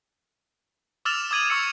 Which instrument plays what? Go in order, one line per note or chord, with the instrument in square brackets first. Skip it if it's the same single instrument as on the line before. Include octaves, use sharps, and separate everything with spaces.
[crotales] D6 E6 F6 A6 E7 F7
D6 D#6 G#6 D#7 F#7
C#6 E6 C#7